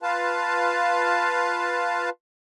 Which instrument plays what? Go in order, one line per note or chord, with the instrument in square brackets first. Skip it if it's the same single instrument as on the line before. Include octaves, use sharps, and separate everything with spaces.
[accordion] F4 B4 F5 A5